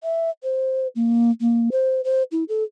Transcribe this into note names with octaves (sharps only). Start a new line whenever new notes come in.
E5
C5
A#3
A#3
C5
C5
E4
A4